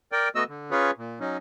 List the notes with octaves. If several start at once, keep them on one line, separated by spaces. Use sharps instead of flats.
A#4 D5 G5
A3 B3 F#4 D#5 E6
D3
C#4 F4 G#4 B4 C#5
A#2
F#3 C#4 D#4